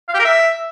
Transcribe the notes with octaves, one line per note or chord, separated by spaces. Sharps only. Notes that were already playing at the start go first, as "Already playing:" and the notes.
F5
G4
A#4
E5